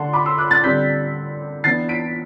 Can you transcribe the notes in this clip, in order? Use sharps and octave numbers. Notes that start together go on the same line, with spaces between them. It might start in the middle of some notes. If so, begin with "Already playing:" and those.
Already playing: D3 A3 D4 F#5 A5 C6
B5 D6
C6 E6
D6 F#6
F#6 A6
D3 G3 C4 G6 B6
E3 B3 D4 A6 C7
B6 D7